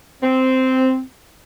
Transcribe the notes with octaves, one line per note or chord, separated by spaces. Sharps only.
C4